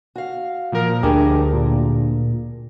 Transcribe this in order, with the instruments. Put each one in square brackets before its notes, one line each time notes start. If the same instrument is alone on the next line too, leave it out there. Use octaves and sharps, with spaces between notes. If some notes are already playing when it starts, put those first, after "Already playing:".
[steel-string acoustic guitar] F#4 F5
[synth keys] A#2 F3 A#4
[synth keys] D2 [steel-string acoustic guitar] D4 G#4 A#4 [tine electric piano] G4
[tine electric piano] A#2